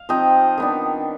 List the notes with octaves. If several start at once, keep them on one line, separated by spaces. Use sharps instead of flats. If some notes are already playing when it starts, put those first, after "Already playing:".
Already playing: F5
F3 C4 D#4 D#5 G5
D#3 B3 D4